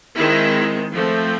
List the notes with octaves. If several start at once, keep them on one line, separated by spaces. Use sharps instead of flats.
D#3 G#3 C4 E4
F3 A3 C4